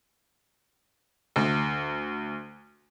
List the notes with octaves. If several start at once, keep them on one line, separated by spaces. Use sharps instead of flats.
D2